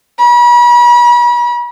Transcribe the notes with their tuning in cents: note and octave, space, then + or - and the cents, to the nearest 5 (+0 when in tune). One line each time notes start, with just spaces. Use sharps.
B5 -40